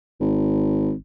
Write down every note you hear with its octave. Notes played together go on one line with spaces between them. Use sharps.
G#1